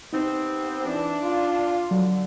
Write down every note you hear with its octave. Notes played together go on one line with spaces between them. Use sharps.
C3 B3 C4 D#4
E3 D4
F4
D3 F#3